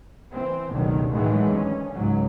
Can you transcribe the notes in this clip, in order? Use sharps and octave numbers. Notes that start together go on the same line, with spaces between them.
E3 C4
F1 C#2 B2 D3 D#3 F#3
A2 D#3 E3 F#3 G#3 A3
D2 C#4
C#2 G#2 F#3